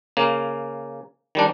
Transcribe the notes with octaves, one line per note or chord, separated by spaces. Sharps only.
C#3 A#3
D#3 G3 D4